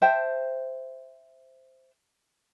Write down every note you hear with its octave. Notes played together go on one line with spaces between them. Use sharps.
C5 E5 G5 A5